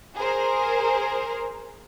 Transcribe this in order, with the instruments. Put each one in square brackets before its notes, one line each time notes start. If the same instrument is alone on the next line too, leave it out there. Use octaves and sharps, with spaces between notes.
[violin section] G#4 A#4 C5